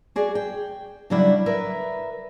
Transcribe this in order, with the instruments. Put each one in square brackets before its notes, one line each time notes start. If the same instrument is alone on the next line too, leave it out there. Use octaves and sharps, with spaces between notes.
[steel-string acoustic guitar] F#4 G#4 D5
G5
C#3 F#3 G3 D4 E4
A#4 B4 E5